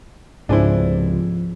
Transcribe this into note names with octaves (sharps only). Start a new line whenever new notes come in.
C#2 G#2 C3 F3 D4 E4 G#4 C5